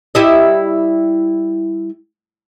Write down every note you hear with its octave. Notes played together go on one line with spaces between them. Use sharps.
G3 E4 D#5